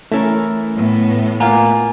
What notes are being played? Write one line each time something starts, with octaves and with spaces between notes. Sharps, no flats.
E3 A3 C#4 A4 A#4
A2 B3
A#3 F4 F5 F#5 G#5 A#5